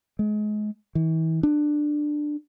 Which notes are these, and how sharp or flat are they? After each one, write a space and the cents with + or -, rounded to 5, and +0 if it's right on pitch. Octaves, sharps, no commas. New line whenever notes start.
G#3 +30
E3 -40
D4 +15